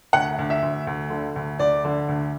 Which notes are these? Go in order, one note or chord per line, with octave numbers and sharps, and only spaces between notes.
D2 F#5
D2
E5
D2
D2
D3
D2
D2 D5
D3
D2